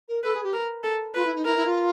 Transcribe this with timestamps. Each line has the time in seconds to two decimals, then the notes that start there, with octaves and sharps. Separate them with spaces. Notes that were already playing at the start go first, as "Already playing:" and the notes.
0.08 A#4
0.23 A4 B4
0.34 G#4
0.43 G4
0.53 A#4
0.84 A4
1.15 F4 B4
1.25 E4
1.35 D#4
1.45 E4 A#4
1.56 E4
1.65 F4